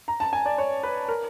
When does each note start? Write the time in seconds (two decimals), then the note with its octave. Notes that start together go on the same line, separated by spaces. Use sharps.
0.08 A#5
0.20 A5
0.33 G#5
0.46 D5
0.58 C#5
0.83 B4
1.08 A#4